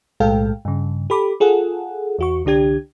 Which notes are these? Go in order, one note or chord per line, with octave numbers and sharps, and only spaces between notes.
B1 A2 G#3 A4 F5 G5
G2 C#3
G4 A4 B5 D6
F4 G#4 A4 F#5
E2 F#4 C#6
C2 D3 D4 G4 G#6